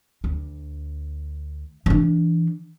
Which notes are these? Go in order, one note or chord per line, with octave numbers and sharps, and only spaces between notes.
D2
E3 D4